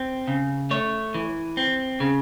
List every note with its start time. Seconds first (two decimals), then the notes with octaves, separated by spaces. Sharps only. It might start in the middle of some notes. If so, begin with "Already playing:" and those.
Already playing: C4
0.28 C#3
0.71 A3 C#5
1.14 E3
1.57 C4
2.00 C#3